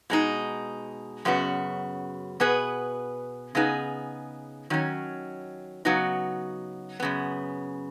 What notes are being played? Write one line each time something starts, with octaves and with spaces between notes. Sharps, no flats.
B2 G#3 D#4
F#2 C#3 B3 F#4
B2 B3 G#4 B4
C#3 B3 D#4 G#4
D#3 F#3 C#4
C#3 F#3 B3 D#4 F#4
F#2 C#3 B3